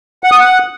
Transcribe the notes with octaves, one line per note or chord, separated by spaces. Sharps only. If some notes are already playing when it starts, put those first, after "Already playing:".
F#5
D#6
F#5